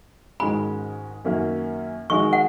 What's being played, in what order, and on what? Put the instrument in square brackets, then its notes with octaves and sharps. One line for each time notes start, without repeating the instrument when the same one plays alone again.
[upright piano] G#2 D#3 G#3 C#4 F#4 [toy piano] B5
[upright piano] F#2 D#3 A#3 C#4 F#4
[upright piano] D#3 G#3 D#4 F#4 [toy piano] C#6
[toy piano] F#5